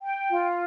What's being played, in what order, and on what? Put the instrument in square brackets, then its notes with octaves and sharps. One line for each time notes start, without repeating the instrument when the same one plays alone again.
[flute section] G5
F4